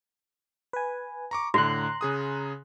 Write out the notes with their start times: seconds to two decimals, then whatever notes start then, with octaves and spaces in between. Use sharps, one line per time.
0.73 B4 G#5
1.31 A#5 C#6 D6
1.54 A2 D3 F#4 A#5 C6 F#6
2.01 C#3 G#4 D#6